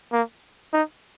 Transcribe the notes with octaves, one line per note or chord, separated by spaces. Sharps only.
A#3
D#4